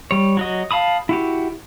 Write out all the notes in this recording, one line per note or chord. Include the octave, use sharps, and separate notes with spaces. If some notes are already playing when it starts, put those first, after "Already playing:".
G3 C#5
F#3 F#4 D#5
F5 A5 B5 D#6
E4 F#4 G4